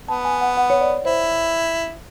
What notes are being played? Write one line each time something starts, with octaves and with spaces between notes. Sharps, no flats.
B3 A5
G#5
F#5
F#5
C#5
D5
E4 C5